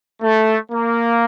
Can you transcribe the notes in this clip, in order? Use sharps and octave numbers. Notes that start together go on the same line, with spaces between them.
A3
A#3